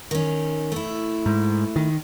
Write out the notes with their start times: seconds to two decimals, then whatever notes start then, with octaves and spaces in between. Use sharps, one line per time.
0.11 D#3 C#4
0.72 A3 E4
1.26 G#2
1.76 D#3